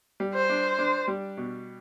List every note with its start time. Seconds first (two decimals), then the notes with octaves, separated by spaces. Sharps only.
0.20 G3
0.35 C5
0.50 D4
0.79 D4
1.08 G3
1.37 B2